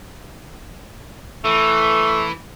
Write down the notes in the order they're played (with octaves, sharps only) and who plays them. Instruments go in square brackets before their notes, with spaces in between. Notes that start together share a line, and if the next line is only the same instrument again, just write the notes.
[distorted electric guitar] E3 [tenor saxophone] A3